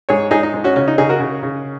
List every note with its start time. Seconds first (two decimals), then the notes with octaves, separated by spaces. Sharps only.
0.09 G#2 G#4 C#5
0.31 G#2 D#4 G#4
0.43 D#4
0.54 G#2
0.64 C#4 F#4
0.76 C#3 C#4
0.88 D#4
0.98 C#3 D#4 G#4
1.09 F#4 A#4
1.20 C#3
1.43 C#3